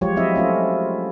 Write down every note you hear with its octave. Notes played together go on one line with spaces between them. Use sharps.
F3 F#3 G#3 F4 G4 C#5
F3 F#3 C4 E4 D#5 E5
A3 C#4 F4